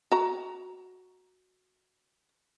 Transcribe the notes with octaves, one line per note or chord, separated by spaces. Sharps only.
F#4 A#5